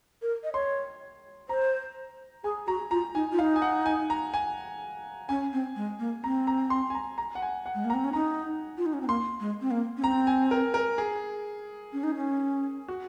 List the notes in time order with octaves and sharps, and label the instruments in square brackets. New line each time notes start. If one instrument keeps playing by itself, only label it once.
[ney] A#4
D#5
[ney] C#5 [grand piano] C6
[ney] C5 [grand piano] A#5
[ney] G#4 [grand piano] G#5
[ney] F#4 [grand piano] A#5
[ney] F4 [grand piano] A#5
[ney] D#4 [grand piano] G#5
[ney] F4
[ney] D#4 [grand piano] F5
[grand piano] G#5
F#5
G#5
A#5
G#5
[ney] C#4 [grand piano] G#5
[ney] C4
G#3
A#3
[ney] C4 [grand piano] A#5
[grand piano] A#5
C6
G#5
A#5
A#5
F#5
G#5
F#5
[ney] G#3
A#3
[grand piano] A#5
[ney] C4
C#4
[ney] D#4 [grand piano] A#5
[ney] F4
D#4
C#4
C4
[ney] A#3 [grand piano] C6
[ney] G#3
C4
A#3
C#4
[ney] C4 [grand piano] A#5
[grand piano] G#5
A#4
A#4
G#4
[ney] C#4
D#4
C#4
[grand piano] F#4